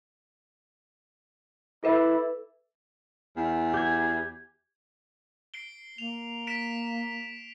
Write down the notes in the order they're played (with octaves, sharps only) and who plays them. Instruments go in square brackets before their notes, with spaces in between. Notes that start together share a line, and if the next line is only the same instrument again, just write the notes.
[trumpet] E4 [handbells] A4 B4 E5
[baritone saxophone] E2
[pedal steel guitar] G4 G#5
[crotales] C7 D7 G7
[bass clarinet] A#3 [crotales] F7
[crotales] B6 D7 E7